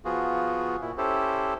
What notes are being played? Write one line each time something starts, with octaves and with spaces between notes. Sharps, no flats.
F3 B3 F4 F#4 G#4
A#2 E4
C#4 E4 G4 A4 C5